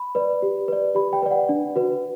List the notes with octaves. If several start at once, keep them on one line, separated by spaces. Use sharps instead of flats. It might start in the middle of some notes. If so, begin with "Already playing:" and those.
Already playing: B5
B4 D5
G4
B4 D5
G4 B5
G5
B4 D5
F#5
D4
F#4 B4